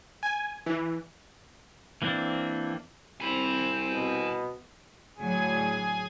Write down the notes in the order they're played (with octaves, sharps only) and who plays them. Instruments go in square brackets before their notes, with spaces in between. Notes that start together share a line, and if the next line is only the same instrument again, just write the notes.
[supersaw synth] G#5
E3
[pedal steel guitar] E3 A#3 C4 D4
[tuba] C2 [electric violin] C4 [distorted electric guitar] G#5 B5
[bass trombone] B2
[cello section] A2 D3 F#3 [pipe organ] G#4 G#5